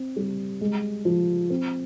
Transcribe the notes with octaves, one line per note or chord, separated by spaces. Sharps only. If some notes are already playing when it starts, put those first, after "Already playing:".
Already playing: C4
G3
G#3
F3
C4